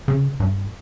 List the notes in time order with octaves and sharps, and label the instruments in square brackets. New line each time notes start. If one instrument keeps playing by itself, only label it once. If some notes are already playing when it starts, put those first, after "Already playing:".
[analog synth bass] C#3
G2